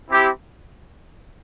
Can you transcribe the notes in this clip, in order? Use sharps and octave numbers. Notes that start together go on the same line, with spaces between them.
C4 E4 G4